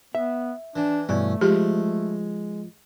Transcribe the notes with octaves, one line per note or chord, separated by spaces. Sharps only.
B3 E5
E3 D4
G2 B2 E3 A3 C#4
F3 G#3 G4